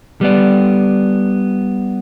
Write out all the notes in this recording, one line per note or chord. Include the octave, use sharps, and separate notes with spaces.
G3 B3 D5